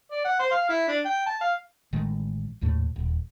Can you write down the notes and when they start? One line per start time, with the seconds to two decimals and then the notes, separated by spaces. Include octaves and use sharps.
0.12 D5
0.25 F#5
0.40 C5
0.51 F5
0.69 E4
0.88 D4
1.05 G5
1.26 A5
1.41 F5
1.93 A1 D#3 G#3 A3
2.61 G#1 D#2 A2 A3
2.96 D#1